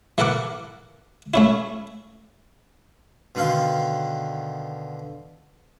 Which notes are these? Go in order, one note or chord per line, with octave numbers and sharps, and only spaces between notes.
E3 A4 A#4 F#5 D6
A3 C#4 E4
B2 D3 D#3 F5 C6